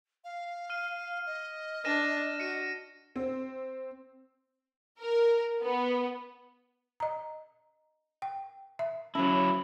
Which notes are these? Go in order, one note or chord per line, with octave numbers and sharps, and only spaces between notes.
F5
F6 D#7
D#5
D4 A#6 D#7 E7
F#4 C#7 D#7 E7
C4
A#4
B3
D#5 A#5
G5
E5
F#3 C#4 E4 C#5